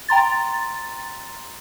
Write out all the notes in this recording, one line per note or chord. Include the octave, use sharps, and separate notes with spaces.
G5 A#5 C6 A6